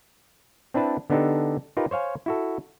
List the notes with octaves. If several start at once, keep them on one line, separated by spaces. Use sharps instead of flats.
C4 D4 E4 B4 A5
D3 B3 D4 D#4 G4 A4
D#4 F4 G4 A#4 B4
C5 C#5 F5 G#5
E4 F#4 A4